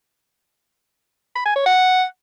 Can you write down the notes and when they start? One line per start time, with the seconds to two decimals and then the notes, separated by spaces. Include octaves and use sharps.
1.36 B5
1.46 G#5
1.56 C#5
1.66 F#5